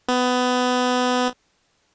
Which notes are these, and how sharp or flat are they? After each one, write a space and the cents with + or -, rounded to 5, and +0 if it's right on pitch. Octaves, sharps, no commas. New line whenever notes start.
B3 +20